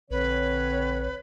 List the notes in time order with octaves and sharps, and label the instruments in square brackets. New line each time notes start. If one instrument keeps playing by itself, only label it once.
[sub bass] A#1 [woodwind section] D3 C4 C#5 [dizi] B4